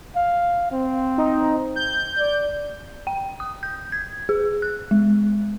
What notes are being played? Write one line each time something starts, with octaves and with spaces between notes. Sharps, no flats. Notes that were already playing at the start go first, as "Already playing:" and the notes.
F5
C4
D#4
G6
D5
G5
D#6
G6
G#6
G#4
F#6
G#3